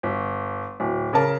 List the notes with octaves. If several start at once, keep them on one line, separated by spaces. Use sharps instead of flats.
G1
D1
C#3 A#4 A5